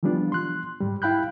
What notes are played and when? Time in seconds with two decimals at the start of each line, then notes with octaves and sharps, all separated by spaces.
0.03 E3 F3 G3 B3 D4 F4
0.32 C6 F#6
0.80 G#2 G3
1.02 E4 F5 G5 B5 F#6 G6